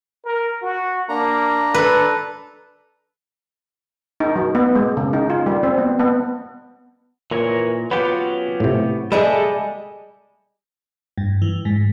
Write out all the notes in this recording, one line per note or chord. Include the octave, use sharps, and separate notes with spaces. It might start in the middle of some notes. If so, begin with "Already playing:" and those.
A#4
F#4
A#3 D4 A#5
A4 B4
D#4
F#3
B3
G#3
C#3
D#4
F4
G3
C4
B3
B3
A#2 E3 A#4 C#5
F#3 B3 C#4 F4 G4 B4
A2 C3
G3 G#3 G#4 A4 D#5 E5
G2
E3
G#2